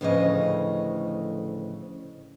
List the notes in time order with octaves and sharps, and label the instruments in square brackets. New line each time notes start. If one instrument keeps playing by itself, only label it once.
[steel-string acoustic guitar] D2 A2 C#3 E3 F3 D#5